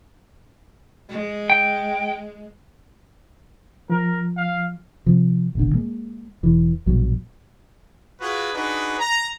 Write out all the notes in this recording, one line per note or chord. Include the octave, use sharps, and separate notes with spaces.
G#3
G5
F3 A#4
F5
C3 F3
D#1 G#1 B2 D3
G#3 A#3
E1 E3
A#1 G2 B2 F#3
F4 F#4 G#4 B4
D4 D#4 F#4 G#4 B4
A#5